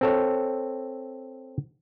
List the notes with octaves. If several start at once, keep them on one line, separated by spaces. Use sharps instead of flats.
C4 A4 C#5